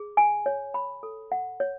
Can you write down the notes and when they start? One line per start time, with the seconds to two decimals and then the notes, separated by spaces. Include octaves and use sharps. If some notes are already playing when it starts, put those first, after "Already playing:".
Already playing: G#4
0.17 G#5
0.46 C#5
0.74 B5
1.03 A4
1.32 F#5
1.60 C#5